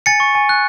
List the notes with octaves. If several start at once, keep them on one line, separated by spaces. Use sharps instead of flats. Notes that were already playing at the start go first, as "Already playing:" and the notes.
G#5 A6 C#7
C#6
G#5
F#6